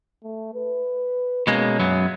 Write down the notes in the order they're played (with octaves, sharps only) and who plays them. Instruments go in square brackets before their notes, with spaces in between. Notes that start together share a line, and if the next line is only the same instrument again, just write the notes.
[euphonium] A3
B4
[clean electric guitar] B2 G#3 A#3 [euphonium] C#4
[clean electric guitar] F#2 F#3 B3